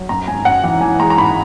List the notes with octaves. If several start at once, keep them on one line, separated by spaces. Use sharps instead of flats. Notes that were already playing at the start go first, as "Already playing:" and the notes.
Already playing: F#3
F#2 A#5
G#1 G#5
F#2 F#5
E3 F#5
E3 G#5
G#3 A#5
A#5
G#1 B5